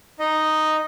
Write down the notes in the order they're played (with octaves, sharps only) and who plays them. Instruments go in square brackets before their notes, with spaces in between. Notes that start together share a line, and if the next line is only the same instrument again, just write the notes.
[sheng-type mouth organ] D#4 D#5